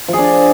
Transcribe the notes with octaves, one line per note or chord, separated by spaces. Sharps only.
F3
G#4
D4